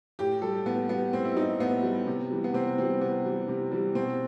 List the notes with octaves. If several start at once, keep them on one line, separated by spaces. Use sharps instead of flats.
A2 G4
G3 A4
A2 B3
G3 B3
A2 C4
E4
G3 D#4
A2 B3
G3
C3
E3 G3
B3
C3 C4
E3 G3 C4
C3 B3
E3 G3
C3
E3 G3
B2 C4